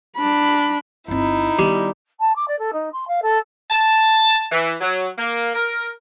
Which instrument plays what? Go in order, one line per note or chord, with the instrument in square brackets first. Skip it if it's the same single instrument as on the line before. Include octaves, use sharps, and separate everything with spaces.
[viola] D4 B5
[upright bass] G1 C4 [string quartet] D#4 E4
[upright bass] D#3 B3 [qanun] G3
[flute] A5
D6
D5
A4
D#4
C6
F5
A4
[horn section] A5
E3
F#3
A#3
A#4